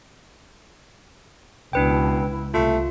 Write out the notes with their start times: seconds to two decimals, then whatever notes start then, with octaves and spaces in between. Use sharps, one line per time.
1.73 C#2 B2 D4 E4 B4 G5
2.54 C2 A3 F4